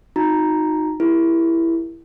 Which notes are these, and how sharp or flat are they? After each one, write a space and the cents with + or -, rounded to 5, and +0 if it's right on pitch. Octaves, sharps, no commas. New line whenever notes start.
D#4 +0 F#4 -40 A#5 +5
E4 +10 G4 +40 A#4 +0